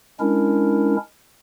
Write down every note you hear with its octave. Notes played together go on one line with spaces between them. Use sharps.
G#3 C#4 D4 E4 A#4